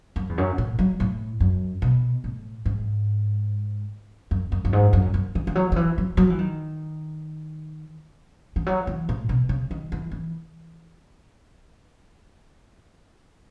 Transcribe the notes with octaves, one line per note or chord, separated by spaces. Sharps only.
F#2
E2
F#2
A2
F#3
A2
F#2
B2
A2
G#2
F#2
F#2
F#2
G#2
F#2
F#2
E3
E3
F#3
D#3
E3
F#3
F#3
E3
D#3
E3
F#3
E3
A2
B2
C#3
D#3
E3
E3